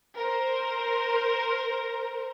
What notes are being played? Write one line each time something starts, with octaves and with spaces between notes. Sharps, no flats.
A#4 C5